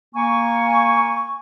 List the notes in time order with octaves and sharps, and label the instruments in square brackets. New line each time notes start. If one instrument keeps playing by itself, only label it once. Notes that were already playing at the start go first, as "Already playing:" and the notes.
[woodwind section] A#3 G#5 C#6